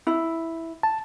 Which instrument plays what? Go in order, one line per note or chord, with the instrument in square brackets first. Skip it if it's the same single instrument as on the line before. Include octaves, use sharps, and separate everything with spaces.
[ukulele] E4
[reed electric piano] A5